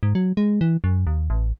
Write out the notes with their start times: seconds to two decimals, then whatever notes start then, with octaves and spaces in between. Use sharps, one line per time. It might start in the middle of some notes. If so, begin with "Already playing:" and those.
0.03 G#2
0.15 F#3
0.37 G#3
0.61 E3
0.84 F#2
1.07 D#2
1.30 A1